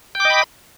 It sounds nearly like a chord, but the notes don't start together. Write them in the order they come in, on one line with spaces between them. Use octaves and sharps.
G5 D6 D#5 B5